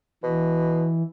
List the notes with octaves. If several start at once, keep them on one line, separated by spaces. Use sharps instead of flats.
B2 E3